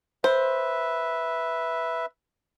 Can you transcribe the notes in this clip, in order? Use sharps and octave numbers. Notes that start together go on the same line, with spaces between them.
B4 C5 E5